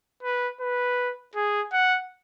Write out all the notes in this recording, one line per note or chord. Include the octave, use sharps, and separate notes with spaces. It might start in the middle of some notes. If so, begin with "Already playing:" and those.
B4
B4
G#4
F#5